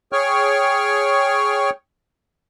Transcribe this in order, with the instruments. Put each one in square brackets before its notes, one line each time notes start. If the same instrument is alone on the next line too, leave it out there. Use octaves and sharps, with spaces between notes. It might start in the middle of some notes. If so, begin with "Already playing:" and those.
[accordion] G#4 C#5 G5 C#6 F6